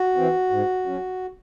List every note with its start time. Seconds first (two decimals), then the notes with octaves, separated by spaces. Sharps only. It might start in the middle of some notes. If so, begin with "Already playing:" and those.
Already playing: F#4
0.16 E3 C4
0.50 G#2
0.86 F#3 C#4